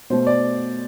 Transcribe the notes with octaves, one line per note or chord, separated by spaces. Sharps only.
B2 A3 C5
D5